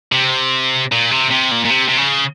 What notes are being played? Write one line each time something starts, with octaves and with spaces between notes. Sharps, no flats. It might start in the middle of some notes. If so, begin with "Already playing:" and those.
C3
A#2
C3
C3
A#2
A#2
C3
C3
C#3